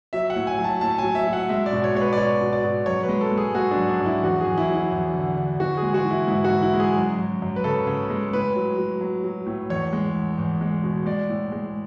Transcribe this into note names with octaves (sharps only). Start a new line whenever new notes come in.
F#3 E5
F#5
A2
G#5
F#3
A5
A2 A5
G#5
F#3
E5
F#3
F#5
G#3 E5
D5
B2
C#5
G#3 C#5
B4
D5
B2 C#5
B2
D5
B2
F#2 C#5
B4
G#3
A4
G#3
G#4
G#3 F#4
D4
F#2
D4
F#2
E4
E2 F#4
E2 G#4
E4
F#3
E4
E2
D3
D3
E3 F#4
G#4
G#3
F#4
E3
E4
G#2 E4
F#4
E3
E4
G#3
G#4
F#2
F#2
F#2
B4
C#3 A4
C#3
G#3
A2 B4
F#3
F#3
F#3
F#3
A2
E2 C#5
G#3
E2
E2
G#3
B2
G#3 D5
A2
G#3